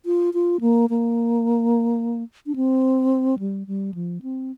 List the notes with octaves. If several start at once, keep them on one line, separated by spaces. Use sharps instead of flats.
F4
F4
A#3
A#3
D4
C4
G3
G3
F3
C4